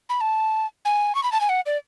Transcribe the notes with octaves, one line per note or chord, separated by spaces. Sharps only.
B5
A5
G#5
C#6
B5
A5
G#5
F#5
D5